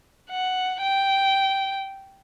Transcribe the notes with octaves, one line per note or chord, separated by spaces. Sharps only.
F#5
G5